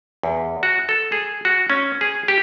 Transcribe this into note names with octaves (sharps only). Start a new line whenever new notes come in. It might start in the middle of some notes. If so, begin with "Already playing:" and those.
E2
F#4
A4
G#4
F#4
C#4
G#4
G4